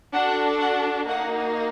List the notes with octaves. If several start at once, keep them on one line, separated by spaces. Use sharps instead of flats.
D4 F#4 A4 F#5
F#5
A#3 D#4 F#4 F#5